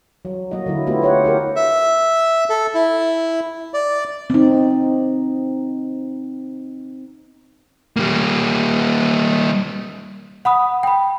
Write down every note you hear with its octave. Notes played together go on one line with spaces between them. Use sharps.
F#3
F#3 A#3 F#4 D#5
D3 F#3 E4
A3 B3 E4 F4 G4
G4 C#5 F#5
E4 G4 A#4
E5
A4
E4
D5
C4 D#4
G3 A#3
F#5 B5 D#6
G5 B5